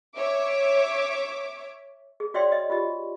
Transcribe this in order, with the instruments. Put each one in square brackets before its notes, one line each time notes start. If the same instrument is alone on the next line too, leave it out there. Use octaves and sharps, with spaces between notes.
[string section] C#5 E5 D6
[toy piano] G#4
F#4 C#5 D5 E5 G5 C6
D#5 E5
F4 G4 D#5